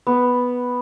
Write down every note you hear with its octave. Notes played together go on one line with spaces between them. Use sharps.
B3